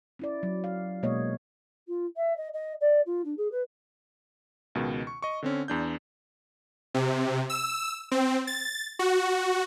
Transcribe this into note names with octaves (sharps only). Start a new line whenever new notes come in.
C#4 E4 D5
F#3
F5
B2 G#3 A#3 B3 C#5 D#5
F4
E5
D#5
D#5
D5
F4
D4
G#4
B4
C#2 B2 D#3
C#6
D#5 C#6
D3 C4 C#4
E2 D4 G6
C3
E6
C4
A6
F#4